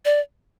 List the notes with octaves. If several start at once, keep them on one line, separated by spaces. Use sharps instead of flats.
D5